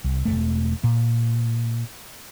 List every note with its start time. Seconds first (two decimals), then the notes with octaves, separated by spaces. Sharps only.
0.04 C2
0.25 E1 F2 A3
0.84 A#2